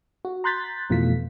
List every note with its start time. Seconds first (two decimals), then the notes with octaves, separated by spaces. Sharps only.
0.25 F#4
0.44 A#5 C6 F#6 G6 A6 B6
0.90 F2 B2 E3 A3 F4 B6